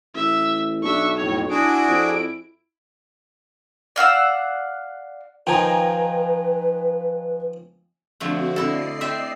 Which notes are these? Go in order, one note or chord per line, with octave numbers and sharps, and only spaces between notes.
A1 E5
B1 D4 E5 C#6
F2 A2 C#5
D4 E4 F#4 G#4 D7
F2
D5 F5 F#5 E6
D#3 F3 B4 G5 G#5 A#5
D3 F3 A3 C4 F#4
D3 E4 A4 D5 D#5 C7
C4 E5 G5